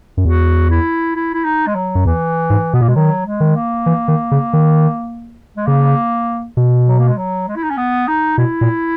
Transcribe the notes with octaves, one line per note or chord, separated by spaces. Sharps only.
F#2
E2 F#4
E4
E4
E4
D#4
G#3
F#3
F#2
E2 E3
G#2
B2 B3
A#2 A#3
B2 G#3
D#3 F#3
G#3
D#3
A#3
E3
D#3
C#3
D#3
G#3
C#3 A#3
B2
F#3
A#3
G#3
F#3
G#3
E4
D#4
C#4
B3
D#4
B2 E4
A#2